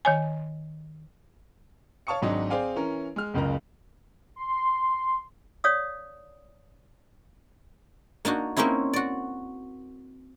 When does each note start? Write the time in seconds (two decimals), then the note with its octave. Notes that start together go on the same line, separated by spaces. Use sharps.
0.05 D#3 C#5 G#5
2.07 C#5 F5 A5 C#6 D#6 C#7
2.22 G#1 G#2 F#3 D4 D#5
2.50 C4 G#4 D5 F5 G5 G#5
2.76 E3 C#4 A#4
3.16 G#3 F6
3.34 F#1 C#2 C#3 A#4 A#5
4.36 C6
5.64 C#5 D5 F5 D#6
8.25 A#3 D4 D#4 F#4
8.57 A#3 C4 C#4 D#4 E4
8.93 F#4 D5